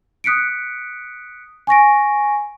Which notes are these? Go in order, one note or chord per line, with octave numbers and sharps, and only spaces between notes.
D#6 F#6 B6 C#7 D7
G#5 C#6 A#6 D7